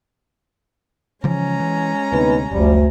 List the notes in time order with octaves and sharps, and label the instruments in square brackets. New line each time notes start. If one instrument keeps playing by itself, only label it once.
[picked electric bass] C#3 E3 F3 [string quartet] G#3 C#4 A#5
[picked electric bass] E3
[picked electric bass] D2 C3 [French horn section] B3 D#4 B4
[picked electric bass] F#1 [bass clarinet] D2 [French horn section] F3 G3